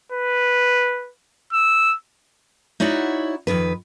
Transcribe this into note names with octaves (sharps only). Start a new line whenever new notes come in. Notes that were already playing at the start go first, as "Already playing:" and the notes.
B4
E6
D#4 E4 F#4 C#5 D5 F#5
F2 B2 D#3 B4